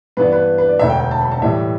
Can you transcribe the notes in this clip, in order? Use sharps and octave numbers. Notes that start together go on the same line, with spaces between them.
G2 E3 B3 D4 B4
B4
B4
D5
E1 D2 D3 E5
G5
G5
A5
B5
A5
A2 E3 G3 E5